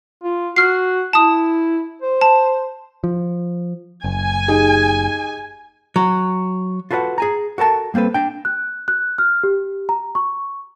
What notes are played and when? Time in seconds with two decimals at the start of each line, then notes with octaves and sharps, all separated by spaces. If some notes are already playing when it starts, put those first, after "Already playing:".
0.24 F4
0.56 F#4 F6 C7
1.13 E4 A5 D#6
2.02 C5
2.21 A5
3.04 F3
4.04 F#1 G#5
4.48 D#4 G4 G#4
5.96 F#3
6.91 F4 F#4 A4 B4 C#5 F#5
7.18 G#4 G#5 A#5
7.58 F#4 A4 A#4 A5
7.94 G3 A#3 C4 A4 B4
8.14 D4 G5
8.45 F#6
8.88 F#6
9.18 F6
9.43 G4
9.89 A#5
10.15 C#6